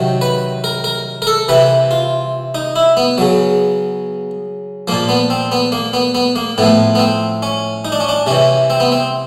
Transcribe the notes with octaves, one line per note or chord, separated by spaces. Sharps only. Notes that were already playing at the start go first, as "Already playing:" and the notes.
Already playing: C3 D#3 F#3
B4
A#4
A#4
A#4
A4
C3 E3 B4
F4
D#4
E4
B3
C#3 F#3
A#2 F3 A#3
B3
C4
B3
A#3
B3
B3
A#3
A2 F3 B3
B3
C4
C#4
D#4
D4
C#4
D4
C3 E3 C#4
C4
B3
C4